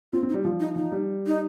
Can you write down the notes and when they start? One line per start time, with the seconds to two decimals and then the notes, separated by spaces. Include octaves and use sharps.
0.13 C4 F4
0.23 C4
0.29 D#4
0.34 G3
0.44 F3 F4
0.60 D#4
0.76 F3 D#4
0.92 G3
1.27 D#4